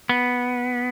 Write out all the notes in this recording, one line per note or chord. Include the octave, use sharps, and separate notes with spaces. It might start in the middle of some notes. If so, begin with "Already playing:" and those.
B3